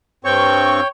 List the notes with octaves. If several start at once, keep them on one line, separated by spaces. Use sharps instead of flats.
G2 C4 C#5 G5 C#6